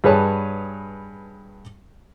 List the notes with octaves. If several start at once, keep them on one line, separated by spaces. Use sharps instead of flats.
G2 G#4 B4 C#5 A5